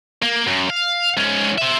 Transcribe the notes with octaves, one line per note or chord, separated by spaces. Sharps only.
A#3
F#2
F5
G#2 C#4
C5 E5